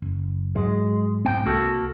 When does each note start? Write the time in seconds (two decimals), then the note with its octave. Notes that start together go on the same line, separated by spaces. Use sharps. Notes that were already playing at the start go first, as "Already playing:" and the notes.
0.02 F#1
0.55 G#2 F#3 G#3
1.25 B1 G#2 C4 G5
1.46 C2 A#3 F#4 A4